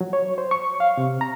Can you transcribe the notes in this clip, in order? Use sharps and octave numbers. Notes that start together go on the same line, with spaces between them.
F#3
C#5
C5
C#6
F5
C3
A#5